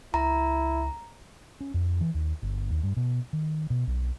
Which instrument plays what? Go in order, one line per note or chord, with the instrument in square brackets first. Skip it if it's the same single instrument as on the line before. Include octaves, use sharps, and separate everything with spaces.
[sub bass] C#2 [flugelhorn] E4 [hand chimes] A#5
[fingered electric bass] C#4
F2
E3
D#2
G1
D#2
G2
B2
D#3
B2
B1